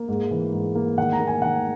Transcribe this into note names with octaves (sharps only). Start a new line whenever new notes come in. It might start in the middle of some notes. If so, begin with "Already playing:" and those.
Already playing: A#3
G#2
E3
G#2
A#3
D#3 F#5
A#5
A#3
G#5
D#3 F#5